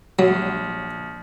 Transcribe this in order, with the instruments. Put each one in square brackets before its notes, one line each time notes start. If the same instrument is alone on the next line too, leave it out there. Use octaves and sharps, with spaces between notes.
[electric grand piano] A#1 [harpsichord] F#3